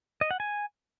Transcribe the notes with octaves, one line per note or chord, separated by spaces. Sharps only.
D#5
F#5
G#5